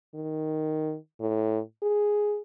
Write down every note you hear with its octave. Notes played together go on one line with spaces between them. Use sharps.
D#3
A2
G#4